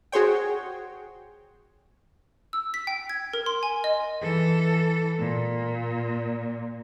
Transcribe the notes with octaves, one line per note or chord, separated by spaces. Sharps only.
F#4 G#4 C5 C#5 G5
E6
B6
G5
G#6
A#4
C6
G#5
D#5
E3 A4
A#2